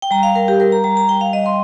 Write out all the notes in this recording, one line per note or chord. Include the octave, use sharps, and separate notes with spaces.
G5
G3 A#5
F5
G3 A#4
G4
G3 A#4
A#5
G3 A#5
A#5
G3 G5
F5
G3 D#5
C6